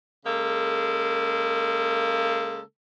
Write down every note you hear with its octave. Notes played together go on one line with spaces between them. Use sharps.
C#3 G#3 A#3 A4